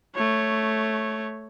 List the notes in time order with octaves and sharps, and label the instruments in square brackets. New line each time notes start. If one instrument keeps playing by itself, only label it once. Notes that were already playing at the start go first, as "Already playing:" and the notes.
[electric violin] A3 C#5